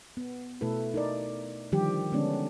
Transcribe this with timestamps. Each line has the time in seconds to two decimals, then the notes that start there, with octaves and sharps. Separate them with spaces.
0.17 B3
0.61 B2 A3 E4 A4 B4
0.94 D#4 A#4 D5
1.72 D3 D#3 F3 G3 G4
2.12 D3 G#3 B3 C#4 D4